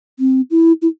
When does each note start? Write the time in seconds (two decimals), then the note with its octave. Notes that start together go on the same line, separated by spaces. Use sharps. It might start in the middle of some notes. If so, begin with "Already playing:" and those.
0.19 C4
0.51 E4
0.82 E4